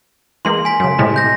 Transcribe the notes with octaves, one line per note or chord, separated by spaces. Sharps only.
E3 G#3 A#3 C6
G#5 B6
F#2 C#3
A2 C3 G#3
G6 A#6